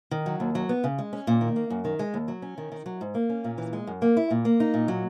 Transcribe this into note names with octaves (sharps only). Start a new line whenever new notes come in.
D#3
F#3
D#2
F#3
B3
C#3
G#3
C#4
A#2
D#3
A#3
F#2
D#3
G#3
D#2
F#3
C#4
D#3
D#3
F#3
G#2
A#3
C#4
A#2
E3
G#3
F#2
A#3
E4
A#2
A#3
D#4
A#2
F#3